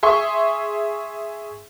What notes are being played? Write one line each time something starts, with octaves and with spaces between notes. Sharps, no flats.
G#4 E5 C6 C#6